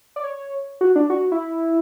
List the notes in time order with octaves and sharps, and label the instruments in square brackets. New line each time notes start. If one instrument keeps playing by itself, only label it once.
[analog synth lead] D5
C#5
F#4
D4
F#4
E4